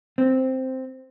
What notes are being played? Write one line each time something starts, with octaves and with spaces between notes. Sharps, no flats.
C4